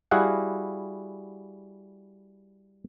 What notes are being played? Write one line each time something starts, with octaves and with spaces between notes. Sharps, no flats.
G3 E4 F#4 G#4 F5 F#5